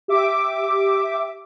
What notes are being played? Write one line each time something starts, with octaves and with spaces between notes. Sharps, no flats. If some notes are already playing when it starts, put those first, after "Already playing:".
G4 E5 D6